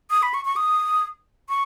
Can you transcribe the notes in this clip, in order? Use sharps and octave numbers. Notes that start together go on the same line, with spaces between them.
D#6
B5
C#6
C#6
D#6
C#6